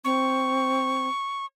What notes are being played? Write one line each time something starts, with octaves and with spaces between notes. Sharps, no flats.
C4 C#6